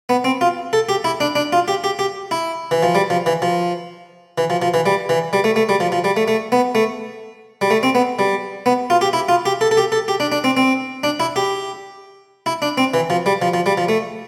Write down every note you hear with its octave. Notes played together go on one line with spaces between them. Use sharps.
B3
C4
F4
A4
G4
E4
D4
D4
F4
G4
G4
G4
E4
E3
F3
G3
F3
E3
F3
E3
F3
F3
E3
G3
E3
G3
A3
A3
G3
F3
F3
G3
A3
A3
B3
A3
G3
A3
C4
B3
G3
B3
F4
G4
E4
F4
G4
A4
A4
G4
A4
G4
D4
D4
C4
C4
D4
E4
G4
E4
D4
C4
E3
F3
G3
F3
F3
G3
F3
A3